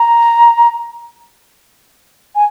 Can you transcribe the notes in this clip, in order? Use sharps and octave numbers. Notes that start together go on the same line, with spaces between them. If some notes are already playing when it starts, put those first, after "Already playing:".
Already playing: A#5
G#5